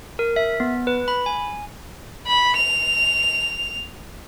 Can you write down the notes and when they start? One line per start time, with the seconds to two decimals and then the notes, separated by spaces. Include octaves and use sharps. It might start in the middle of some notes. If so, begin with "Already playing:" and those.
0.19 A#4
0.36 E5
0.60 B3
0.87 B4
1.08 B5
1.26 G#5
2.27 B5
2.57 F7